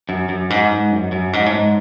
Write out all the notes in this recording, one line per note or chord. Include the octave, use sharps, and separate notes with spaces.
F#2
F#2
G#2
G#2
F#2
F#2
G#2
A2
G#2